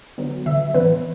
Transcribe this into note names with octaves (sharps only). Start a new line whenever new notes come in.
D3 F#3 B3
D3 F#3 B3 E5
A2 E3 B3 B4